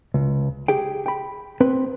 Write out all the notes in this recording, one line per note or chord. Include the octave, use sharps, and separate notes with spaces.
C#2
G4 G#4 G5
G5 B5
C4 B4 G5